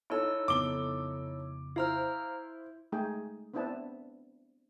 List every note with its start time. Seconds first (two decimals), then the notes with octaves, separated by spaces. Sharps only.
0.10 D#4 E4 A4 C#5 E6
0.48 F2 C#3 B3 D6 G7
1.76 E4 C5 F5 A#5 F6
2.92 G#3 A3 D#4 G#4 G5
3.54 B3 C4 D4 E4 B4 A5